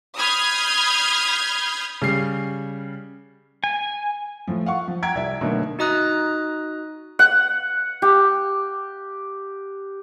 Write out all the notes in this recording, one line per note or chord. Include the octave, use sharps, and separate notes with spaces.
B5 D#6 F6 G6 G#6 C7
C#3 G3 C7
G#5
A2 F3
F5 F#5 C#6
F3
F#5 G5 A#5 G#6 D7
C2 E5
B2 D3 D#3 F#3 A3 A#3
D#4 F#4 D#5 A#5 D#6 F#6
F#5
G4